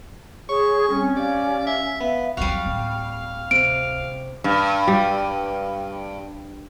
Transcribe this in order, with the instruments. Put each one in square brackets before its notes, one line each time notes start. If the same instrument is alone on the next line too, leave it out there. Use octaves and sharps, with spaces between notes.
[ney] G#4 [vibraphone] C#5 [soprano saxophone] C#6
[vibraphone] G3 C4 [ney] C#4
[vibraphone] G4 F5 [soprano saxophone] D5
[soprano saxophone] E5
[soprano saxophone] B3 [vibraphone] E5 F5
[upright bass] F2 F#3 [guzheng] G3 F#4 [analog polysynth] F5
[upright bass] D1
[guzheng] C3 [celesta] D7
[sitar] G2
[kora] G3